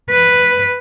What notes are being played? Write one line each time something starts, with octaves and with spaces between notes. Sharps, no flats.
B4